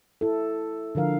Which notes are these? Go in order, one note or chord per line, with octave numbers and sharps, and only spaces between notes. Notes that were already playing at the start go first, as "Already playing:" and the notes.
E4 A4
D3 F3 A#4 F5